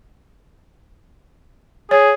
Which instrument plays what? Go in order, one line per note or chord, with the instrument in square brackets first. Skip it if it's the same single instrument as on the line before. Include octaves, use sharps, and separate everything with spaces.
[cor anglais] G#4 [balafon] C#5